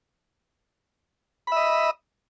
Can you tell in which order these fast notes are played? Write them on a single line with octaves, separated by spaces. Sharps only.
B5 E5 D#5